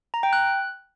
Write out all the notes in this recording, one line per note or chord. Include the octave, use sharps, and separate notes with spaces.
A#5
G5
F#6